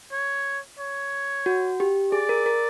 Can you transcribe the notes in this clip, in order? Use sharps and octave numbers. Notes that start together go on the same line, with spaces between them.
C#5
C#5
F#4
G4
G#4 D5
A#4
A#4